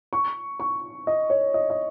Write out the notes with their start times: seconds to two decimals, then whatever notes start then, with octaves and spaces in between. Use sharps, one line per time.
0.13 C#6
0.60 C#6
1.07 D#5
1.30 C#5
1.54 D#5
1.70 D#5